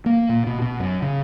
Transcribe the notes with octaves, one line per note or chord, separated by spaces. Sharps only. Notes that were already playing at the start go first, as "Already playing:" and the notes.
A#3
A#2
B2
B2
F#2
C#3